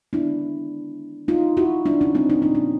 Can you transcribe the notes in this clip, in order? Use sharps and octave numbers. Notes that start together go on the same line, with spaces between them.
D#3 G#3 B3 D4 E4
D#4 F4
E4 F#4
D4 E4
C#4 D#4
C4 D4
D#4
A#2 F3 A#3 D4
C#4